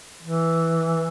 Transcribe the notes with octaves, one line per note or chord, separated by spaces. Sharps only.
E3